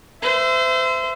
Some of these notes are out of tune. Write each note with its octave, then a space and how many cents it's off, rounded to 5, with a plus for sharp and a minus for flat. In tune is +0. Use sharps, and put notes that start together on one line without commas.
C5 -30 E5 +15